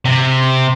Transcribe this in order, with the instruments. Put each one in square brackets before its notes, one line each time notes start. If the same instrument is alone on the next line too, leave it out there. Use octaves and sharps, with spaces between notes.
[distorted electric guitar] C3